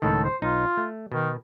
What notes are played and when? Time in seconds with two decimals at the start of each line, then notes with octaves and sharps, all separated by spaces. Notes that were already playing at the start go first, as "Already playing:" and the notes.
0.02 C#2 A2 D#3 A4
0.25 C5
0.42 B1 D#4 F4
0.77 A3
1.12 B2 D#3